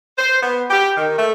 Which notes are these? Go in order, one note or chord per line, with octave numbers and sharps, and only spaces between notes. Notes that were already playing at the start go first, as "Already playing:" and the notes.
C5
B3
G4
D#3
A3